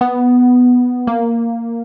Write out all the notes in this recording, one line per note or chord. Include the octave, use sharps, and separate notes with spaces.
B3
A#3